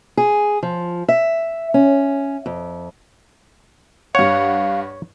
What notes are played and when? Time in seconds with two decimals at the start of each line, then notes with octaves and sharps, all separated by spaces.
0.17 G#4
0.63 F3
1.08 E5
1.74 C#4
2.46 F2
4.15 G2 C#5 F5 F#5